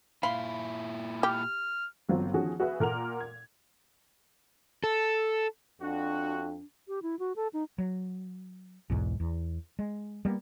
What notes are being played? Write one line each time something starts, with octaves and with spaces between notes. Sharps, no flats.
A#2 E4 F5 B5 C6
G4 F6
G1 F#3 C4 F4
D#3 F3 C#4 F#4 G#4
F#4 G#4 B4 E5
A#2 A#4 F#5 F7
G#6
A4
F2 D4 F#4
G4
E4
F#4
A4
D#4
F#3
B1 E2 G#2
E2
G#3
G3 A#3 B3